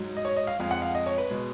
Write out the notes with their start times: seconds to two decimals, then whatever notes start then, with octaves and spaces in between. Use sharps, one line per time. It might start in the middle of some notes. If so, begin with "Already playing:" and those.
Already playing: G#2 F#3
0.17 D#5
0.25 C#5
0.36 D#5
0.47 F5
0.59 F2 F3 G#3 F5
0.71 F#5
0.82 F5
0.95 D#5
1.06 C#5
1.18 B4
1.30 B2 G#3